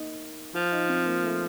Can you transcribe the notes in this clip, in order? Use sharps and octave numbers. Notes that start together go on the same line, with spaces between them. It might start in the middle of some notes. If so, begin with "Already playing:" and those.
Already playing: A#3 D#4
F3 F4
D#4
C4
A#3
A3